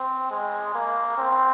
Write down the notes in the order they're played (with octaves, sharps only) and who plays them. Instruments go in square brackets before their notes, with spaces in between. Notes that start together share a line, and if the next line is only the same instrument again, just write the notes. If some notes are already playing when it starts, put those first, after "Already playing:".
Already playing: [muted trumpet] C4
G#3
A#3
C4